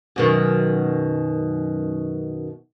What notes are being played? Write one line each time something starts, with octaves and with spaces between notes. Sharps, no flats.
F#2 B2 D#3